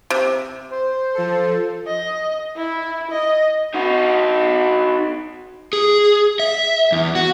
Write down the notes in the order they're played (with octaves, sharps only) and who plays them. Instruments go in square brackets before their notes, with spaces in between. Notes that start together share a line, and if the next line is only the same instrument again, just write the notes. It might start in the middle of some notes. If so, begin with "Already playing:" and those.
[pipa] C3
[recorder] C5
[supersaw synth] F3 A4
[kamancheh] D#5
E4
D#5
[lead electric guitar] D#4 F#4
[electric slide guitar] G#4
E5
E2
F#4